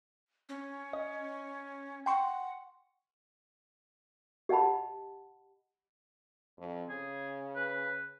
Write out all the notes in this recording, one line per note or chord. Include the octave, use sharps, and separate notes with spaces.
C#4
D#5
F#5 G5 C6 C#6
G4 D#5 F#5 A5 B5
F2
C#3 G#4
B4